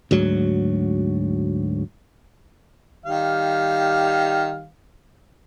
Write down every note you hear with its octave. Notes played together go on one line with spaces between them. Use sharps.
D2 G#2 F#3
D#3 G3 F5